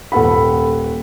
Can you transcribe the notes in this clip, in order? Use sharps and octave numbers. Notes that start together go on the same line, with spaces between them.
D#1 A4 F#5 B5